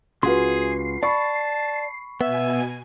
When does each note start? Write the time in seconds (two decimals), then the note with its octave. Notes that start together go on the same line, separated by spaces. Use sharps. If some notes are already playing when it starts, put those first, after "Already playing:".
0.23 C#2 C#3 F4 F#4 G#4 B4 C6 C7
1.03 D5 A5 B5 C#6
2.21 B2 B3 E5 G#5